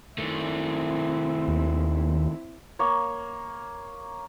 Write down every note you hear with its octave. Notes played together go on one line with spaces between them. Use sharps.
D#3 A3 C4 E4
D#2
A#3 C#5